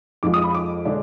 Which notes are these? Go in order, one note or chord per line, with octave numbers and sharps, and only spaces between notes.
F2 F3 G#3 D6
D#6
B5
D6
D3 G#3 D4